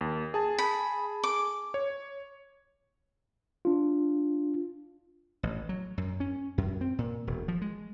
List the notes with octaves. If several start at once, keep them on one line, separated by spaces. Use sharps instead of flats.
D#2
G#4 A5
B5
D6
C#5
D4 F4
A1
F#3
F#2
C#4
F#2
C4
A#2
E1
F3
G#3